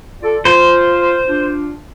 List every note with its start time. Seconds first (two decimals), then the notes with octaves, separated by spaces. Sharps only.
0.22 F4 A4 D5
0.45 F4 C5
1.26 D4 F4